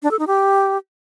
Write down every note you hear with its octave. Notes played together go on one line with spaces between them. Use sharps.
D4
A4
D#4
G4